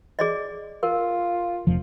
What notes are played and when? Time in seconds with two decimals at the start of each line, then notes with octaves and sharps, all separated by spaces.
0.19 G#4 D5 D#5
0.83 F4 A#4
1.67 F1 F3